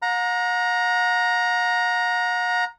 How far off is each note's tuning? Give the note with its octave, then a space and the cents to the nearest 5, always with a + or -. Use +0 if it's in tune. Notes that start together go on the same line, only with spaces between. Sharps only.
F#5 -45 A#5 +5